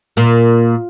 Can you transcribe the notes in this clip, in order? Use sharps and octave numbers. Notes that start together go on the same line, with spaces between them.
A#2